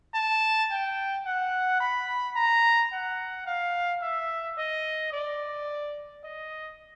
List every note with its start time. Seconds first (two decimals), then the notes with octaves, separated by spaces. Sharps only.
0.14 A5
0.70 G5
1.25 F#5
1.80 B5
2.35 A#5
2.92 F#5
3.46 F5
4.02 E5
4.57 D#5
5.12 D5
6.24 D#5